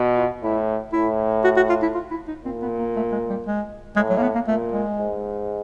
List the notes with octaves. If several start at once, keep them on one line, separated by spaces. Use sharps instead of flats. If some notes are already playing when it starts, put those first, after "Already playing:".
Already playing: B2
F4
A2 E4
A2 E4
F#4
F#4
F4
E4
F4
E4
D#4
A#2 C4
B3
A#3
A3
G#3
G3
G#3
A2 G#3
F#3
A#3
B3
A#3
A#2 A3
G#3
G#2